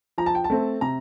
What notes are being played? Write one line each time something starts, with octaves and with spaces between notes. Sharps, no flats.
F3 A#5
A5
G5
A5
A3 C4
C3 A#5